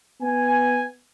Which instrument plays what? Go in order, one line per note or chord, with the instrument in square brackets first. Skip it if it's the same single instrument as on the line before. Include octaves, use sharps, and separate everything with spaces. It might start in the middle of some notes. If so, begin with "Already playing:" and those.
[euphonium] B3 [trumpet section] G#5